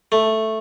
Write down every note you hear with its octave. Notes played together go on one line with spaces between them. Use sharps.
A3